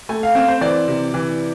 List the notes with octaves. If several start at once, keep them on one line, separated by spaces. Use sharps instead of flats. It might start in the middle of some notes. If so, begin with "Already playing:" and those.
A3 G#5
F5
C4 F5
C5
E3 D5
C3
E3